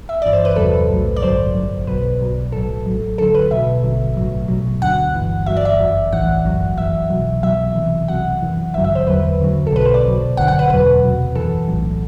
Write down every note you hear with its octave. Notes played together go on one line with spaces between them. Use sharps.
E5
G1 G2 E3 D5
C5
B4
E2 C3 F#3 A4
B1 A2 F#3
D5
A1 G2 D3 F#3 C5
G1 G2 F#3
B1 B2 F#3 B4
B1 B2 F#3
B1 A2 F#3 A4
A1 A2 F#3
D2 D3 F#3 A4
B4
B1 B2 F#3 E5
A1 G2 D3 F#3
B1 A2 F#3
C2 B2 F#3
D2 D3 F#3 F#5
G1 G2 E3
G1 G2 F#3 E5
D5
E5
G1 F#2 F#3
B1 A2 E3 F#5
G1 F#2 F#3
F#2 E3 E5
C2 B2 F#3
C2 B2 F#3 E5
C2 C3 E3
C2 C3 F#3 F#5
F#2 E3
A1 G2 D3 F#3 E5
E5
C5
E2 D3 F#3 B4
D2 D3 F#3
A4
B1 B2 F#3 B4
C5
D5
C2 B2 F#3
G1 F#2 D3 F#5
F#5
B4
E2 B2 F#3 B4
D2 C3 F#3
F#2 E3 A4
B1 A2 F#3